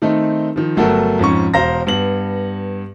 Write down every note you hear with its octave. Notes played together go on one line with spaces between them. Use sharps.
D#3 A3 C4 D#4
D#3 F3
G1 F#3 A3 F#4 A4 A#4
F2 G#2 C#4 C#6
E1 C5 F5 A#5 A#6
G2 B3 F#7